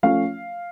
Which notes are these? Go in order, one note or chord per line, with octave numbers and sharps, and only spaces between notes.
F3 A3 C#4 F5